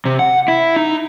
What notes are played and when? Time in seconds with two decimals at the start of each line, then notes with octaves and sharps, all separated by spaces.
0.05 C3
0.19 F#5
0.48 E4
0.76 D#4